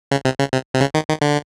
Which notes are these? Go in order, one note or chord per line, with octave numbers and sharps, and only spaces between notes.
C#3
C3
C#3
C3
C3
C#3
D#3
D#3
D3